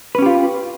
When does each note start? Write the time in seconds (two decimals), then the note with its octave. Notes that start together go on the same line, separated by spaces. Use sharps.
0.15 B4
0.18 C#4
0.22 G4
0.26 F4